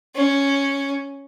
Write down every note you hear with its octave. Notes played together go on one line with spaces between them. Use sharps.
C#4